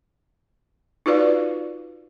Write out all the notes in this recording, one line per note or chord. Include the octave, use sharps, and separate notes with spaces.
D#4 F4 F#4 B4 D5 F5